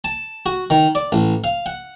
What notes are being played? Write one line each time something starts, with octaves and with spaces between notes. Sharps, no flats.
A5
F#4
D#3
D5
A1
F5
F#5